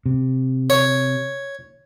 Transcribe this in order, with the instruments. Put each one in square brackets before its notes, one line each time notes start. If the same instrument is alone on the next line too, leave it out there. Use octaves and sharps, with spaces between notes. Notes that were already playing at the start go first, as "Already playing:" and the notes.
[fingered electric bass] C3
[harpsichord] C#5